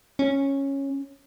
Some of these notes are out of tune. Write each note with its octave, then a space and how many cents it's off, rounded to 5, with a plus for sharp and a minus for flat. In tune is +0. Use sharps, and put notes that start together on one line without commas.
C#4 -10